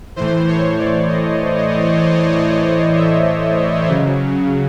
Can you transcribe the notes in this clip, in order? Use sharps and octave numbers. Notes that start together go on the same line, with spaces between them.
A2 E3 C5
C#5
D5
D#5
D#5
E5
C#3 F#3